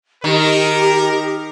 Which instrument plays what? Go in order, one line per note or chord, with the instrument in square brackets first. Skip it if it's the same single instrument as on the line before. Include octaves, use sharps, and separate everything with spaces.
[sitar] D#3 [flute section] G4 [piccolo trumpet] A#4